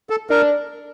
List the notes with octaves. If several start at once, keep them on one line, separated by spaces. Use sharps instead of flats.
A4
D4 A#4